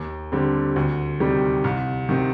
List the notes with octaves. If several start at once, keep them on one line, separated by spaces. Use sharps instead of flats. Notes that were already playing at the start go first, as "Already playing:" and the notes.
Already playing: D#2
D3 G3 C4
D2
C3 D#3 G3
C2
C3 D#3